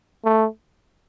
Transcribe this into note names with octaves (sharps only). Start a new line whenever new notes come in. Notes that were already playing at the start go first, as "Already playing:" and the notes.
A3